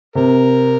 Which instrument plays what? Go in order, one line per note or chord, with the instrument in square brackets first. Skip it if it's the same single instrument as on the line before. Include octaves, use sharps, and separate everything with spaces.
[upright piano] C3 [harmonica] A#4